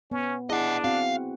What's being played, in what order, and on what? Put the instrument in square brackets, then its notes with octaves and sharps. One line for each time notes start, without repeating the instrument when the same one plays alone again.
[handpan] B3 [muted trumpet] C#4
[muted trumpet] D4 [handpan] E4 G#4 [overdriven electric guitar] D#5 F#5
[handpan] C4 F#4 F#5 [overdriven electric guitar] F5